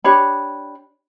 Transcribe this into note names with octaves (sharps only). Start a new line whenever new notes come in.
D4 G4 C#5 B5